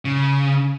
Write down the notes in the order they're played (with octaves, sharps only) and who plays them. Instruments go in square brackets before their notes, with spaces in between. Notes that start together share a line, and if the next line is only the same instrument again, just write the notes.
[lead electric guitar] C#3